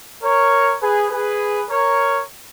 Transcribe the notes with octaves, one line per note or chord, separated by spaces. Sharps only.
A#4 C#5
G#4 B4
G#4 B4
A#4 C#5